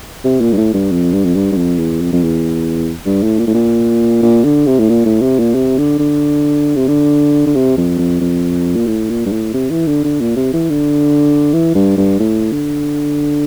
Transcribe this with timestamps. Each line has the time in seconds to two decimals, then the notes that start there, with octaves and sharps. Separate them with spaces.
0.24 C3
0.41 A#2
0.53 G2
0.57 A2
0.73 G2
0.91 F2
1.13 G2
1.24 F2
1.35 G2
1.52 G2
1.56 F2
1.79 E2
2.01 F2
2.13 F2
2.24 E2
3.06 G2
3.23 A2
3.39 A#2
3.47 A2
3.54 A#2
4.22 A#2
4.44 D3
4.66 C3
4.79 A2
4.89 A#2
5.05 A2
5.22 C3
5.39 A#2
5.55 C3
5.78 D3
5.99 D3
6.76 C3
6.88 D3
7.46 D3
7.55 C3
7.77 F2
7.98 F2
8.21 F2
8.76 A#2
8.87 A2
9.09 A#2
9.26 G2
9.32 A2
9.54 C3
9.70 E3
9.87 D3
10.04 D3
10.21 A#2
10.36 C3
10.53 E3
10.70 D3
11.53 E3
11.75 G2
11.97 G2
12.19 A2
12.52 D3